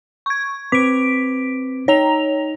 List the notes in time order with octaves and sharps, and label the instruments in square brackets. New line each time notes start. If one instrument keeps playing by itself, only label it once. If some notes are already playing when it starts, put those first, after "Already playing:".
[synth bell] C#6 G#6
[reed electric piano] C4 B4 D6 [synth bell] B6 D7
[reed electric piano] D#4 [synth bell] C#5 A#5 F7